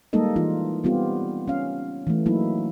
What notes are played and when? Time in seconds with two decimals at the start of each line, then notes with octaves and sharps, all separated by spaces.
0.13 G3 G#3 A#3 D#4 A4 D#5
0.36 E3 D#4 F4
0.84 G3 B3 C4 F4 G4
1.48 C#4 F5
2.07 E3 A3
2.26 F#3 A#3 D#4 E4